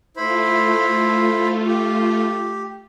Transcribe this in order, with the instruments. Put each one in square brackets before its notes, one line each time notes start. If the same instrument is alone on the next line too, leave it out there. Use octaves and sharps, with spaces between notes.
[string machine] A3 F4 [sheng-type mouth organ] E4 C5 B5
[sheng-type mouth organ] G4